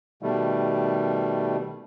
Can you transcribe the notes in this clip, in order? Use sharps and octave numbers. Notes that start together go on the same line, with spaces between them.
B2 D#3 G3 A3